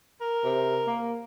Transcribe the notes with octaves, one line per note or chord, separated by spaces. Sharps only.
A#4
C3
A#3